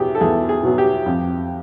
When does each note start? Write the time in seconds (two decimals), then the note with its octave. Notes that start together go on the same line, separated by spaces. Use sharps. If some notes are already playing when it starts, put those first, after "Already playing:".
Already playing: E2 B2 F#3 G4 G#4
0.15 A4
0.21 E2 G#4
0.49 G#4
0.63 B2 F#3
0.78 G4
1.06 F2